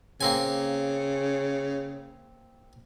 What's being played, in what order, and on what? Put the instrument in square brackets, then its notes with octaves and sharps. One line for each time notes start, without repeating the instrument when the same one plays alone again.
[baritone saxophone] C#3 [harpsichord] A#3 C4 G#5